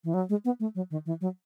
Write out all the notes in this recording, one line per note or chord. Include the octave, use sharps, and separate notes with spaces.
E3
F#3
G#3
B3
A3
F#3
D#3
E3
F#3